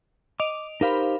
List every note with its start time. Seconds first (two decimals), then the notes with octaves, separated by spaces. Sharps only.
0.40 D#5 D6 D7 F7
0.81 D#4 G4 A#4 C5 F5 B5